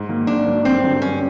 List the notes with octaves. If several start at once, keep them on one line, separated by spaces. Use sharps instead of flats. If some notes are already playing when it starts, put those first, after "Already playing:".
Already playing: G#2
D#3 F#3 A#3
G#2 D4
D#3 F#3 A#3
G2 C4
D3 F#3
G2 C#4